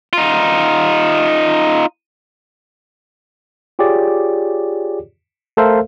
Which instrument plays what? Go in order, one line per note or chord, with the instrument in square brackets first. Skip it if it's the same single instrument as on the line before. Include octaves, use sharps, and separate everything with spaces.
[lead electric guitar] D#4 F4
[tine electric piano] F4 G4 G#4 C#5 D5
A3 A4 A#4 C5 E5 F5